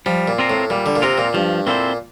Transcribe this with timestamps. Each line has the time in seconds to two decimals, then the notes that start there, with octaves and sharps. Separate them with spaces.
0.06 F3 G3
0.28 A#2
0.38 C4 F4 A#4
0.50 A2
0.70 A#2 G3
0.86 D3
0.96 A#2
1.02 C3 C4 F4 A#4
1.18 A#2
1.34 G2 F3
1.67 A#2 C4 E4 A4 C5